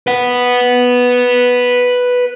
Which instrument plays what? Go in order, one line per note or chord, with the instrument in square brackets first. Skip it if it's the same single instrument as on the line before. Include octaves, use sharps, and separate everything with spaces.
[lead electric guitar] B4 F#5